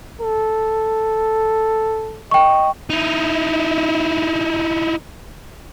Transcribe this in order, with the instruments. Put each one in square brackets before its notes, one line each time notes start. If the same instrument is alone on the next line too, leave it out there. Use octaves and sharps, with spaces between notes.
[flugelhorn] A4
[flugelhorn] D#5 [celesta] G5 C#6
[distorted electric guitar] D#4 E4